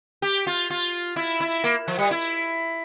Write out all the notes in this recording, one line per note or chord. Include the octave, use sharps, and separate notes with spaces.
G4
F4
F4
E4
E4
A#3
F3
G3
E4